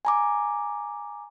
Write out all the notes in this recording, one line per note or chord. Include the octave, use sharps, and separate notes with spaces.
G#5 A#5 D6